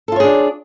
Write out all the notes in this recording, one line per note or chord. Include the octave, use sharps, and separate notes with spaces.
D4 F4 G#4 A4 C#5